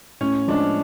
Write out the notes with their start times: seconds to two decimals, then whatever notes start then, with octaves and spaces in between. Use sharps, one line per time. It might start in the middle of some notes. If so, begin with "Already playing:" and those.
0.21 A2 C#4
0.48 F3 G#3 D4